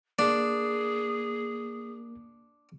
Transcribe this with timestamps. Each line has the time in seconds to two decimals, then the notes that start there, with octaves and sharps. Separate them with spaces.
0.19 A#3 D4 G#4